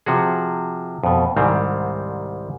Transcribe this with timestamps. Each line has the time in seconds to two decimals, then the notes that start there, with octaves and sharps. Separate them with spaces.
0.06 C3 F3 F#4 G#4
1.04 F2 B2
1.36 C2 G#2 D#3 G3 C4